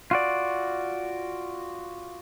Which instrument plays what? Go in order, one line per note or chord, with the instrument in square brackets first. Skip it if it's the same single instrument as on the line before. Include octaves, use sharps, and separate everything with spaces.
[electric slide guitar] F4 F#4 D5